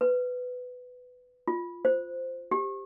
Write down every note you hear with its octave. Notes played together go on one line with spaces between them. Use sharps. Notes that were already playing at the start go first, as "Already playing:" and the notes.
B4
F4
C5
G4